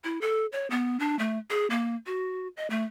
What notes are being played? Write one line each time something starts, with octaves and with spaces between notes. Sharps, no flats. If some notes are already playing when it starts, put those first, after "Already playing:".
E4
A4
C#5
B3
D4
A3
G#4
A#3
F#4
D#5
A3